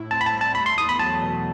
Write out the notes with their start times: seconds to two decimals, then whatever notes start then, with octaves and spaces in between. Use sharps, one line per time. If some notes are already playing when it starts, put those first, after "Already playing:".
Already playing: A2 E4
0.11 C4 A5
0.21 B5
0.26 A5
0.33 G3
0.41 A5
0.55 A3 B5
0.66 C6
0.77 E2 D#6
0.89 B5
0.99 F#3 A5
1.22 B2